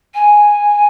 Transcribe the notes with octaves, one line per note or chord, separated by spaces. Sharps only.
G#5